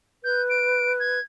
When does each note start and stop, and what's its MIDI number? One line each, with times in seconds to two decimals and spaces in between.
0.24 1.19 71
0.24 0.42 91
0.49 0.92 98
0.99 1.20 92